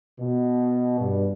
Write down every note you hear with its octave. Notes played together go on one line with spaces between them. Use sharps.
B2
G2